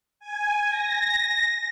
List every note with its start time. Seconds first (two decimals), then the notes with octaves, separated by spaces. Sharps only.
0.19 G#5
0.70 A#6